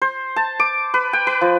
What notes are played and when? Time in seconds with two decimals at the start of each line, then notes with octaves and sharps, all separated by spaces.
0.02 C5
0.36 A5
0.60 D6
0.94 B4
1.13 G5
1.27 B4
1.41 F3